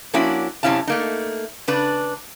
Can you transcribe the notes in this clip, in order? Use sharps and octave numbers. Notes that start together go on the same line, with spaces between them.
F3 A#3 C#4 D4 E4 F#4
F#2 C3 C#4 E4 F5 A5
A3 A#3 D#4
C#3 D4 B4